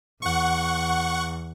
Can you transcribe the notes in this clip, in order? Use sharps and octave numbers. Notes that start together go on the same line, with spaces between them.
E2 F#5 C#6